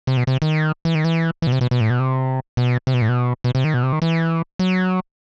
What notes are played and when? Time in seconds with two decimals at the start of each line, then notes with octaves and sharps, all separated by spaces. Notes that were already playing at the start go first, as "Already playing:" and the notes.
0.07 C3
0.17 B2
0.27 C3
0.42 D#3
0.85 E3
0.95 D#3
1.04 E3
1.42 E3
1.47 B2
1.52 C3
1.61 B2
1.71 B2
1.81 A2
1.90 B2
2.00 C3
2.57 B2
2.87 C3
2.94 B2
3.02 A2
3.09 B2
3.44 B2
3.55 C3
3.64 D#3
3.74 B2
3.83 C3
3.93 D#3
4.02 E3
4.59 F#3